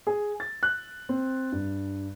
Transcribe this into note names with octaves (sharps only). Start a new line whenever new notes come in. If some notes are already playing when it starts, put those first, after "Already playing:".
G#4
A6
F#6
C4
G2